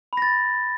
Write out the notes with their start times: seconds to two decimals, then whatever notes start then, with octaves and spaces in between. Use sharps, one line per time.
0.13 B5
0.17 A#6
0.22 A6